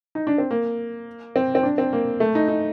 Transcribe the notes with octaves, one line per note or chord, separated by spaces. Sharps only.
D#4
D4
C4
A#3
C4
C4
D4
C4
A#3
A3
D#4
D#4